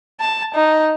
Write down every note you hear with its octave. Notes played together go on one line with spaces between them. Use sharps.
A5
D#4